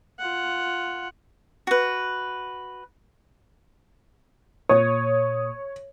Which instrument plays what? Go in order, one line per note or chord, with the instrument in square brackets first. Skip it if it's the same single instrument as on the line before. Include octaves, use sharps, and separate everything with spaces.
[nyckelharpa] F4 F#5
[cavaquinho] F#4 B4
[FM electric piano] A#2 D#6 [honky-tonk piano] C#5